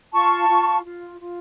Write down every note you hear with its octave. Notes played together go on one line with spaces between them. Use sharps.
F4 A5 C#6
F4
F4
F4